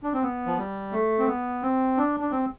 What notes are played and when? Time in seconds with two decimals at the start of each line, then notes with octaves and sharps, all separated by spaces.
0.03 D4
0.13 C4
0.23 B3
0.46 F3
0.58 G3
0.92 A3
1.19 C4
1.27 B3
1.62 C4
1.97 D4
2.20 D4
2.31 C4